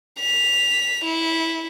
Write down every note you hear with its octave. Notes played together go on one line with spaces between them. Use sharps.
B6 F7
E4